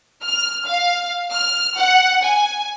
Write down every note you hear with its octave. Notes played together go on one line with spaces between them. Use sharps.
F6
F5
F6
F#5
G#5